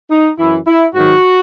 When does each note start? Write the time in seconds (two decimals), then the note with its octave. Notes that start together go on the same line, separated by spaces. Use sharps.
0.11 D#4
0.38 F#2 E3 E4
0.67 E4
0.94 G#2 D#3 F#3 F#4